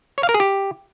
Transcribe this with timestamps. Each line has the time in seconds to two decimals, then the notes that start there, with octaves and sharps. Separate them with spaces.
0.18 C#5
0.23 F5
0.29 A#4
0.34 G#4
0.40 G4